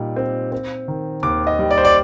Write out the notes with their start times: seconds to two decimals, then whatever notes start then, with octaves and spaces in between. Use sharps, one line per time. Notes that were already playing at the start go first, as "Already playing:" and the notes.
Already playing: A#2 G3 D#4
0.16 C4
0.52 C4
0.88 D#3
1.23 D#2 D6
1.47 D#5
1.59 G3
1.71 D5
1.78 C5
1.85 D5